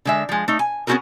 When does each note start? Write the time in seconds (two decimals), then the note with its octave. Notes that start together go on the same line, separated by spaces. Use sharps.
0.05 D3 G#3 E5
0.29 F3 G#3
0.48 A3 D#4
0.59 G#5
0.87 B3 C#4 D#4 F#4 G#4 A#4